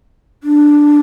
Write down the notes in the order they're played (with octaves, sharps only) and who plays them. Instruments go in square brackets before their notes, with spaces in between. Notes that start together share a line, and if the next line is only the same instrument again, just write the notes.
[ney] D4